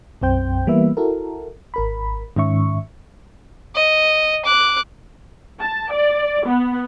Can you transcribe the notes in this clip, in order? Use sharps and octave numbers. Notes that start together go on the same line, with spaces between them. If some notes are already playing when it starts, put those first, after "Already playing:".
B1 F#2 C4 C5 G5 G6
E3 G3 A#3 B3 B4 E5
E4 F#4 A4 A#4
G#1 A#4 B5
G#2 D#3 C#4 E5 C#6
D#5
D6 F#6
A5
D5
B3